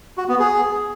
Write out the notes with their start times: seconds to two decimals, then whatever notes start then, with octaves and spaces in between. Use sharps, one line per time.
0.17 F#4
0.28 B3
0.39 G#4